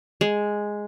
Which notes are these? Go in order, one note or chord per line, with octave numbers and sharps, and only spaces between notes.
G#3